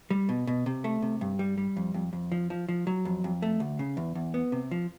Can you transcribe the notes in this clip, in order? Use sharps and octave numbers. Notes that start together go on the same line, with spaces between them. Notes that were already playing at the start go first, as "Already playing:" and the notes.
G3
B2
B2
C3
A3
C3
G2
G3
G3
F2
F2
F2
F3
F3
F3
F#3
F2
F2
A3
D2
C#3
E2
E2
B3
C3
F3